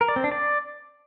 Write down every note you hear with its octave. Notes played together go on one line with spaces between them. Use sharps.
A#4
D5
C4
D4
D5